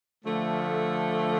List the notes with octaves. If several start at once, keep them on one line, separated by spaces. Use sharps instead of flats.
D3 F3 A3